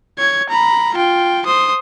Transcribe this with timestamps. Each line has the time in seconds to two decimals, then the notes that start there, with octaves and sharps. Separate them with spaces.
0.18 C#5 G#6
0.49 A#5 B5
0.95 F4 G5
1.46 C5 D#6